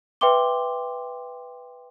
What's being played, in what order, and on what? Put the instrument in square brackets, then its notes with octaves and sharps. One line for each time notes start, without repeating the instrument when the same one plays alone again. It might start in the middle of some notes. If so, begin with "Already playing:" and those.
[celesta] B4 E5 G5 C6 D6 G7